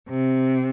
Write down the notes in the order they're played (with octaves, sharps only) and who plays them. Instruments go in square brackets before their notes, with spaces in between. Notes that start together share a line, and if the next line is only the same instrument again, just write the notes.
[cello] C3